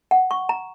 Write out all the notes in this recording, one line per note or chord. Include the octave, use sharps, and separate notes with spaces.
F#5
C#6
A#5